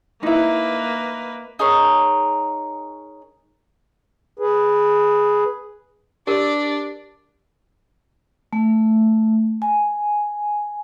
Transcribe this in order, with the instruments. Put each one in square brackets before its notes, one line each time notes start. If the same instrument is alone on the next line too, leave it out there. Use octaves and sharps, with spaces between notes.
[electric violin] A#3 B4 [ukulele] D#4 E4
[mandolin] D#4 G#4 A#4 C#5
[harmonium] G#4 B4
[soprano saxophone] D4 [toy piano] G4 A#4 [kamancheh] D5
[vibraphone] A3
G#5